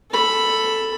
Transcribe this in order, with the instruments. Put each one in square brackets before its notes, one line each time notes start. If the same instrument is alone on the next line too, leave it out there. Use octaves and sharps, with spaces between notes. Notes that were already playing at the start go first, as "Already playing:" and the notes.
[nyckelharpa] A4 B5